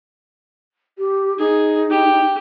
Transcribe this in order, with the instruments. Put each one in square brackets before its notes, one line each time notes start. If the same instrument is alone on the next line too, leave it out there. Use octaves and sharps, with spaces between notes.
[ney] G4
[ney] D#4 [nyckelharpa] G#4
[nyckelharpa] G4